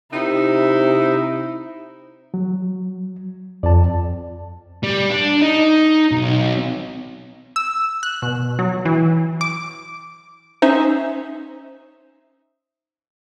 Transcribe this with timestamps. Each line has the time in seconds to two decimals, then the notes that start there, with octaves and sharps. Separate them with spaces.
0.13 C3 D#4 E4
2.34 F#3
3.63 F2 D5 A5
4.84 G3
5.11 D4
5.42 D#4
6.12 B1
7.56 E6
8.03 F#6
8.22 B2
8.59 F#3
8.85 E3
9.41 D6
10.62 C#4 D#4 C5 E5